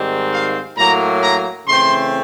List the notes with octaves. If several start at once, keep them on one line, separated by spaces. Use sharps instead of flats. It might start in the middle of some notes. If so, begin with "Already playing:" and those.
Already playing: G#2 D#3 G3 C4
F5
A2 F#3 A#3 A#5
A#5
C#3 E3 A3 C4 C6